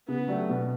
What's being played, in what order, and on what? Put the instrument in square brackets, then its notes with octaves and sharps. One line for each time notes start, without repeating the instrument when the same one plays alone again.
[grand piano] C#3 [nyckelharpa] B3
[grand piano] F#3 A3 D4 G4
B2